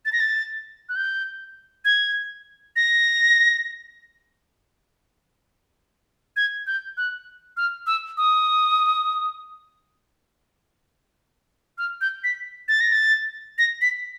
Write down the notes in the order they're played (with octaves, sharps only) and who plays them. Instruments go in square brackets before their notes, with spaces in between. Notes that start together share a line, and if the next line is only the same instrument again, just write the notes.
[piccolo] A6
A#6
A6
F#6
G6
G#6
A#6
G#6
G6
F#6
F6
E6
D#6
F6
G6
B6
A6
A#6
A6
A#6
B6